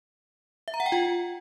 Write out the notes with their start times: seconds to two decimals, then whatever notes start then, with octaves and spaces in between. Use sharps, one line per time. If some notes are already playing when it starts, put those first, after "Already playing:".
0.68 E5
0.74 A#5
0.80 F#5
0.86 G5
0.92 F4